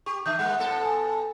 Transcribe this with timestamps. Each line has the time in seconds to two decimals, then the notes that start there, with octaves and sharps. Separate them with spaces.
0.06 G4 C#6
0.26 D3 E5 D#6 G6
0.39 G3 A#3 F#5 D#6 F#6
0.58 A2 B3 A4
0.85 G#5